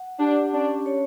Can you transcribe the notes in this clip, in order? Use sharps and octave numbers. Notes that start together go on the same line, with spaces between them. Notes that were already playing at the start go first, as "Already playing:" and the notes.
Already playing: F#5
D4 G4
C#4 D4
C#5